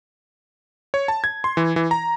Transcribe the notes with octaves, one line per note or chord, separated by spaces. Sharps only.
C#5
A5
G#6
C6
E3
E3
A#5